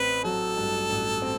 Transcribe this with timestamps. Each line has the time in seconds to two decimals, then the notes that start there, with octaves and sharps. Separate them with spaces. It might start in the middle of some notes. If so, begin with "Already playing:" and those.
Already playing: A1 C4 B4
0.24 F#3 A4
0.57 G2
0.90 A1
1.22 C4